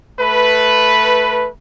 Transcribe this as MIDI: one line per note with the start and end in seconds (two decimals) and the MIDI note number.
0.19 1.49 57
0.19 1.49 71